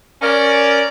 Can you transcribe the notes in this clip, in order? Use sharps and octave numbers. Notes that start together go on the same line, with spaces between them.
C#4 A#4 D5